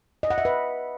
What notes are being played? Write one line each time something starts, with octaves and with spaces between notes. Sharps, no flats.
D#5
F#5
E5
B4